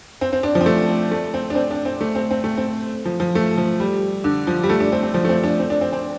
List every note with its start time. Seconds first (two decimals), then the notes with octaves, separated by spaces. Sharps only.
0.21 C4
0.33 C4
0.43 D4
0.55 F3
0.61 C4
0.66 A3
1.11 A3
1.34 C4
1.50 D4
1.55 C4
1.71 D4
1.85 C4
2.01 A3
2.15 C4
2.31 C4
2.44 A3
2.58 C4
3.05 F3
3.20 F3
3.35 A3
3.58 F3
3.80 G3
4.24 D3
4.47 F3
4.63 G3
4.69 A3
4.80 D4
4.92 C4
5.03 C4
5.14 F3
5.25 A3
5.29 C4
5.44 D4
5.60 C4
5.70 D4
5.81 C4
5.93 C4